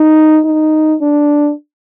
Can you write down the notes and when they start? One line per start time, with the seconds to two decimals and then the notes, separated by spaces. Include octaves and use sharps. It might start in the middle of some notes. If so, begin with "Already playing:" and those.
Already playing: D#4
0.45 D#4
1.01 D4